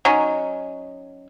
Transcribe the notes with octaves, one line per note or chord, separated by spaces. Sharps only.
F#3 C#4 D#4